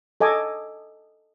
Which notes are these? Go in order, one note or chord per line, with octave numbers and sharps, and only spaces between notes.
A4 D#5 G#5 D6